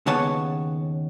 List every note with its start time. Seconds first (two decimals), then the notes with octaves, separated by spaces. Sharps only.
0.07 D#2 C#3 B3 C#5 A5